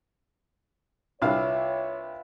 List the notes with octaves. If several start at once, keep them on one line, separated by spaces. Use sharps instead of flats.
C2 D4 F4 B4 C#5 E5 F5